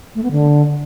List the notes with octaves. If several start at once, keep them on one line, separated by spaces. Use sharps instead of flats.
A3
B3
D3